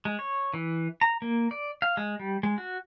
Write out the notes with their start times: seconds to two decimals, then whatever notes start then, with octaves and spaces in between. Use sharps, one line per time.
0.05 G#3
0.19 C#5
0.54 E3
1.01 A#5
1.22 A#3
1.51 D5
1.82 F5
1.97 G#3
2.19 G3
2.43 G#3
2.58 F#4